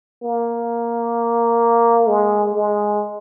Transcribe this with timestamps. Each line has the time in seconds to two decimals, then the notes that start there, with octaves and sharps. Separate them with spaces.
0.23 A#3
2.08 G#3
2.54 G#3